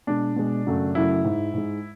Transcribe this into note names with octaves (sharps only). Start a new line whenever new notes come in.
B2 G#3 D4
B2 G#3
F#2 C#3 F#3 A3
F#2 C#3 F#3 A3 E4
G#2 G#3
G#2 G#3